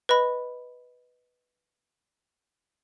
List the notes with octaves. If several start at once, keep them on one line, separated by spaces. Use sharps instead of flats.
B4 D#5 B5